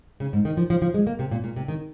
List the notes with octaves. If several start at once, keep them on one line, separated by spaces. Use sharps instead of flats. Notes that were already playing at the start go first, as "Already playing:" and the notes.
C#3
G#2
D#3
F3
F3
F3
G#3
A#3
C3
A#2
A#2
C3
D#3